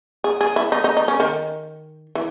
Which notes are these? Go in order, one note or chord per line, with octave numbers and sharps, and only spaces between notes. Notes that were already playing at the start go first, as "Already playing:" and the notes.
G#4
G#4
E4
D#4
D#4
D#4
C#4
D#3
E3